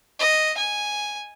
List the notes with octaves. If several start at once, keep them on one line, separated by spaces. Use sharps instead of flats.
D#5
G#5